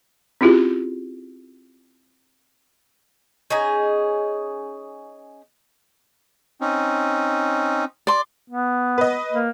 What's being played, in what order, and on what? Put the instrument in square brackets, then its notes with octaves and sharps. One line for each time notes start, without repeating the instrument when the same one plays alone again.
[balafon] C4 C#4 E4 F4 G4 G#4
[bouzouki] C#4 D#4 G#4 A#5
[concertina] C4 C#4 D#4
[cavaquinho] D5 C6
[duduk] B3
[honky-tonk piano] B4 D#5
[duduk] A#3